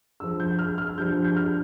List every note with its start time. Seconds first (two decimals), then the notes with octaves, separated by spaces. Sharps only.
0.20 G2 F3 E6
0.40 G6
0.59 F6
0.78 F6
0.97 G2 F3 G6
1.25 G6
1.37 F6